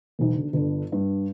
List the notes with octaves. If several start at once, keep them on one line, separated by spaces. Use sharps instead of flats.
E1 B1
D3
G1 D3
G2